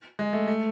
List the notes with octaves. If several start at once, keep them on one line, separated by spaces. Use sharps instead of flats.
G#3
A3
A3